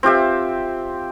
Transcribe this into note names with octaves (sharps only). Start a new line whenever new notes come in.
C4 F4 G4 E5